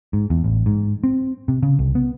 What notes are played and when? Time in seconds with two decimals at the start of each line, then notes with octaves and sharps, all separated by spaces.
0.13 G#2
0.30 E2
0.44 A1
0.66 G#2
1.04 C4
1.48 C3
1.63 C#3
1.79 C2
1.95 B3